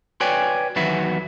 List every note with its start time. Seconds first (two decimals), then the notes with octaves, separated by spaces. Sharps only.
0.21 F#4 B4 C#5 D5 G5 G#5
0.76 E2 D#3 F#3 F#4 B4 E5